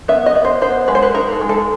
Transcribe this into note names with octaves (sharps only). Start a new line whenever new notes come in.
B3 E5
D#5
B3
C5
B3 C5
G#3 B4
C5
B4
D#4 A#4
A4
G#3
A4